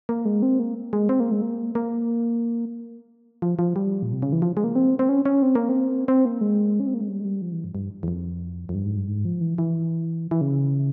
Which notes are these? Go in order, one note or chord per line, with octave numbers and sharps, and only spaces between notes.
A#3
G#3
C4
A#3
G#3
C4
A#3
G#3
A#3
A#3
F3
F3
G3
A#2
C3
C#3
E3
F3
G#3
A#3
C4
C4
C#4
C#4
C4
A#3
C4
C4
A#3
G#3
C#4
C4
A#3
G#3
G3
G#3
G3
F3
E3
G2
G2
E2
F2
F2
G2
G#2
G2
G#2
F3
E3
E3
E3
C#3